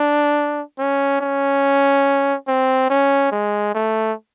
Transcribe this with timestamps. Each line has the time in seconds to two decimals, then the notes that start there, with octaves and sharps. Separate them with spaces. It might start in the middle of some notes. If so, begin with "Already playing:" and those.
Already playing: D4
0.79 C#4
1.21 C#4
2.48 C4
2.90 C#4
3.32 G#3
3.75 A3